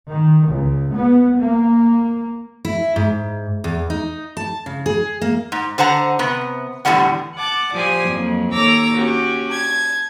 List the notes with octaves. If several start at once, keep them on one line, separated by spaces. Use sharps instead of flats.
D#3
C#2
B3
A#3
E4
G#2
E2
D#4
A5
C#3
G#4
A#3
G#2
D3 C5 F#5 A#5
C3 B3
E2 A2 D3 G3 A#3 F#5
F#5 A5 D6
F3 G4 D5 G#5 C6 D#6
F2 F#3 A#3
D#2 A4 C#5 A#5 D6 E6
C#4 F#4 G4
A5 G#6